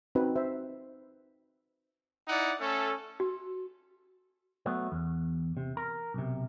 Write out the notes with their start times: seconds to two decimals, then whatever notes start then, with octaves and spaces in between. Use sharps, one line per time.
0.15 C4 D#4 F#4 B4
0.36 C5 E5
2.28 D#4 E4 D5 F#5
2.61 A3 C#4 A4
3.20 F#4
4.66 F#3 A3 B3
4.92 E2
5.57 C3
5.77 A#4
6.14 B1 C3